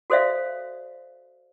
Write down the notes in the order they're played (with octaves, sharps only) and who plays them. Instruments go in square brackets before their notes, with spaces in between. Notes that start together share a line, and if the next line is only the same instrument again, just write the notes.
[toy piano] F#4 A4 C5 D5 E5 F5